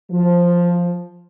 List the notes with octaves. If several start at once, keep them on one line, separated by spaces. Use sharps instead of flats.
F3